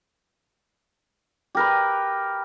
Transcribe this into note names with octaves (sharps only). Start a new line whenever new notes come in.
G4 A#4 B4